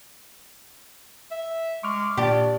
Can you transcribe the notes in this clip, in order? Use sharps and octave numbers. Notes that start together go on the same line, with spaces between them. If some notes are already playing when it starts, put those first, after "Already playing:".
E5
G#3 C#6 D6 F6
A#2 D4 G4 D5